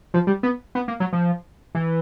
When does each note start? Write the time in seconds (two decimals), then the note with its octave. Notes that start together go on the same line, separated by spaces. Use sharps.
0.14 F3
0.27 G3
0.43 B3
0.75 B3
0.88 A#3
1.00 F#3
1.13 F3
1.75 E3